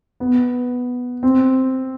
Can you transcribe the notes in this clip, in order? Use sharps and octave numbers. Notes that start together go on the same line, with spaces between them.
B3
C4